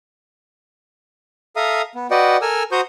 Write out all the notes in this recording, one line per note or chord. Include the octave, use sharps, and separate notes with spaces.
A4 E5 F5 A#5 D#6
B3
F#4 B4 D5 D#5 F#5 G5
A4 A#4 G#5 E6 F6
F#4 C5 A#5 C#6 D#6 G6